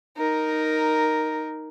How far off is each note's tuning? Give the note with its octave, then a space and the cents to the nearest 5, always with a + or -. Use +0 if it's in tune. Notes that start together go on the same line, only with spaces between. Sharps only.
D#4 +0 A#4 +0